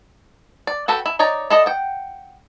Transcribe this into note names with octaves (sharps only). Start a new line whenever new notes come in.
D5
F#4 A4 B4 G5
E4
D#4 C#5 D5 A#5
E4 F#4 A4 D5 D#5
F#5 G5